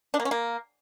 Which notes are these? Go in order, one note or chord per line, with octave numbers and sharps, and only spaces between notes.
D4
A#3
C#4
A#3